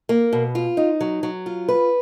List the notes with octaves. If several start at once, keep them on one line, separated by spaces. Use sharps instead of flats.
A#3
B2
F4
D#4
F#3
F#3
F4
B4